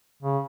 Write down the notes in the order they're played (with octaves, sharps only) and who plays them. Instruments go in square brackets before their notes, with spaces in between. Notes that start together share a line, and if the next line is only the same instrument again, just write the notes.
[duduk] C#3